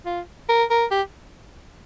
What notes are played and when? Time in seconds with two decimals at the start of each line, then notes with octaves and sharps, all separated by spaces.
0.06 F4
0.49 A#4
0.70 A#4
0.91 G4